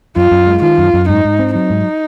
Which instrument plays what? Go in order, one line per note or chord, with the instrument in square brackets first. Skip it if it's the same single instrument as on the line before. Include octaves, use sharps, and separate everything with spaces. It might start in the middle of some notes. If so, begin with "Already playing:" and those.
[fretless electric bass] F#2 [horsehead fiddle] F4
[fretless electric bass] F#2
G#3
[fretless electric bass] D#3 [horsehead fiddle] F4
[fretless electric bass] F#2
F#2
[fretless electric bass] G#2 [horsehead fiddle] D#4
[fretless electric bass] G#2
C4
[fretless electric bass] F#3 [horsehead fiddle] D#4
[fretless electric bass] G#2